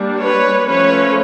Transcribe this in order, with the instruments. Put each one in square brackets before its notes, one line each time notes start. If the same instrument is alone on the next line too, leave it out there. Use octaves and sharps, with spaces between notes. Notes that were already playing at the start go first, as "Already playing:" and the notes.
Already playing: [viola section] G3 A#3 D4
B4 C#5
F3 A3 C#4 B4 C#5